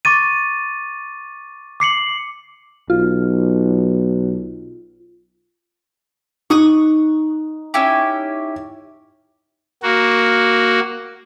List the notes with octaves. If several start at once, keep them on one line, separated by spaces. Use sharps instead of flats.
C#6 D6 A6 D#7
D6 C7 C#7 F#7
B1 F4
D#4 C#6 D#6 F#6
C#4 E4 G4
A#3 F#4